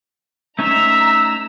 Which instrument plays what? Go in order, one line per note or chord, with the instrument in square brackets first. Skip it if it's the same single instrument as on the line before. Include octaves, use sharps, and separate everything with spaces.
[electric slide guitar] A3 C#4 D#4 [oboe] E5 [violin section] A#5 E6